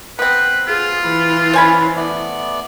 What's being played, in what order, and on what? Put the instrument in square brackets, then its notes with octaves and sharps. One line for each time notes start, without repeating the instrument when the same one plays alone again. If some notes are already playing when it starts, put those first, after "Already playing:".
[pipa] B3 C4 [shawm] B4
[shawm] F4 [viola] G#4
[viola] E3 [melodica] B5
[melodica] C#4 C6 [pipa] C5 G#5 B5
[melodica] A3 B3 D5